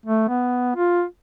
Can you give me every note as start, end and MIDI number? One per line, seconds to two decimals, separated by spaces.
0.06 0.25 57
0.28 0.74 59
0.76 1.03 65